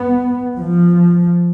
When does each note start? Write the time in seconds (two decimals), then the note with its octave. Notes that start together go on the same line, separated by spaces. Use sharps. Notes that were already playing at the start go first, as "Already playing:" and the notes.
Already playing: B3
0.59 F3